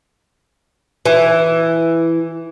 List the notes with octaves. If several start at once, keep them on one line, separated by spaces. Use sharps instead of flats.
E3